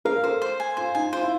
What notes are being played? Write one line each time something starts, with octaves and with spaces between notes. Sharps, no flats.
A#4 F5
A4 C5
C5
G#5
F4 C5
D#4 G#5
F4 C5
E4